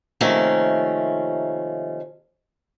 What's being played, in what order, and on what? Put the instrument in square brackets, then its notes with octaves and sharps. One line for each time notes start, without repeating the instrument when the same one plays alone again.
[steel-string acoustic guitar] C3 D#3 F3 A3 A#3 C#4